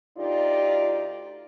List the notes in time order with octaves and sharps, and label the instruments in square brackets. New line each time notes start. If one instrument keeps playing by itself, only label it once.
[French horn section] D2 D#4 F4 G4 D5